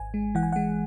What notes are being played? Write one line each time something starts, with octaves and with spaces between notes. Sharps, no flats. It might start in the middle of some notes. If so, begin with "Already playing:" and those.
Already playing: G#1 G#5
G#3
E3 F#5
G#5
G#3 F#5